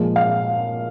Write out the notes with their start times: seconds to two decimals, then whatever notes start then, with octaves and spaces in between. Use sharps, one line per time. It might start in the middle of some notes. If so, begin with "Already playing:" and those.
Already playing: A#2 F3 G#3
0.16 F5